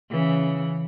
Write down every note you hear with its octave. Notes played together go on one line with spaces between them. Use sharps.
C#3 E3